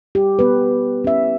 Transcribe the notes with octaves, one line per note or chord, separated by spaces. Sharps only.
G4
B3 B4
C#4 E5